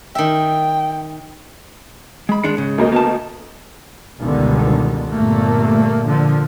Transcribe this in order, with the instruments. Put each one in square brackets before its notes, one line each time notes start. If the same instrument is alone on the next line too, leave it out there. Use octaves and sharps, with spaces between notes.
[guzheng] D#3 E5 [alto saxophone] G5
[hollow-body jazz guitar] G#3 B5
[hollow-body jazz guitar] D#3 G#3 D4 [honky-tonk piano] C#7
[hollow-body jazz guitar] G#2 C#3
[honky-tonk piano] D2 A#3 D#5
[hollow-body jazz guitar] B3 A5
[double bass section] G1 C#2 B2 D3 D#3
G1 A#2 A3 A#3
A#2 D3 F3